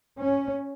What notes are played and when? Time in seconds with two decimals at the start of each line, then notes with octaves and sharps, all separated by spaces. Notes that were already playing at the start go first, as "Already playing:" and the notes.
0.18 C#4